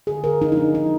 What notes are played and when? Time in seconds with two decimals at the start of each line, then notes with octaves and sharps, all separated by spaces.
0.07 D3 G#4
0.24 D3 A#4
0.41 F3 D#4
0.52 D#4
0.57 A#3 D4
0.74 F3 D#4